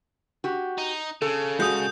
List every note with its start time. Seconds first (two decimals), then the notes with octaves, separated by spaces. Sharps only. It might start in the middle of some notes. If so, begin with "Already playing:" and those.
0.44 F#4 G4
0.78 D#4
1.22 C#3 A4
1.60 G#3 F#4 D#6 G6